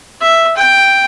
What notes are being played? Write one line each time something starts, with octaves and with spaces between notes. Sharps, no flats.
E5
G5